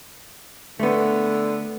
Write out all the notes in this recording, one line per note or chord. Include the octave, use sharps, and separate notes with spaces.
D3 A3 B3